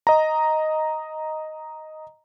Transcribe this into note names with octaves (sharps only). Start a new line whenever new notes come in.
D#5 A#5